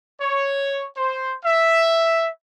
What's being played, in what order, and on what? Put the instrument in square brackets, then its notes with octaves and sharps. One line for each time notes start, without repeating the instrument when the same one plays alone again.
[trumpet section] C#5
C5
E5